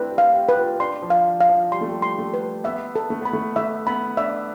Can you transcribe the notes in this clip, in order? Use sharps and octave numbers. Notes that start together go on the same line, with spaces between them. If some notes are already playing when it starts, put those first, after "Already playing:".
Already playing: A3 C4 D4 E4 B4
G4
F5
G4
B4
F4
D4 C6
F3
F5
F5
F3
G3 C6
A3
G3
C6
A3
B4
B3 E5
A4
A3
B3 B5
A3
A3 E5
B3 B5
D4 E5